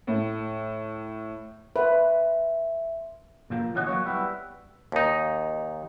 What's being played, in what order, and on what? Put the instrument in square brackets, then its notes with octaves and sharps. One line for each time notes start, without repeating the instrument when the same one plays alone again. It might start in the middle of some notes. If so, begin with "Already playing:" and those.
[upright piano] A2
[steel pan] B4 [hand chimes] E5 C6
[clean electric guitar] A#2 F3 A#3
D#2 E3 C#4 F#4 D5 D#5
F#3 A#3 C#5
G3 B3 E4
[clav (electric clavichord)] D#2 D#4